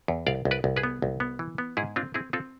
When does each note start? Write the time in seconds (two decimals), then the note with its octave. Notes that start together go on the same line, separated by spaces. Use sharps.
0.08 E2
0.27 C2 D5 F5
0.45 C2
0.51 B4 D5
0.64 C2
0.76 G#4 B4
0.83 B3
1.02 C2
1.20 B3
1.39 E3
1.58 B3
1.77 G#2 E4 G#4
1.96 C4 D4 F4
2.14 C4 E4 G#4
2.33 C4 F4 A4